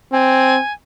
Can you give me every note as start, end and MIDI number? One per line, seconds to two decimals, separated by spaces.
0.12 0.59 60
0.12 0.73 80